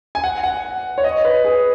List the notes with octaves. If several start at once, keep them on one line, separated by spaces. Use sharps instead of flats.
G#5
F#5
F#5
C#5
D#5
B4
G#4